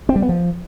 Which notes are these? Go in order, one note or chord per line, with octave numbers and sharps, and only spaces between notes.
C4
G3
B3
F3